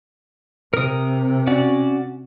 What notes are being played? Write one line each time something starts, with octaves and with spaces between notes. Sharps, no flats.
C3 A#4 D#6
C#4 F#4 D5